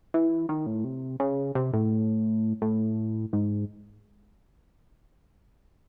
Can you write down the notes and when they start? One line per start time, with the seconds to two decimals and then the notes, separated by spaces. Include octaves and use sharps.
0.14 E3
0.49 D#3
0.66 A2
0.84 C3
1.20 C#3
1.55 C3
1.73 A2
2.62 A2
3.33 G#2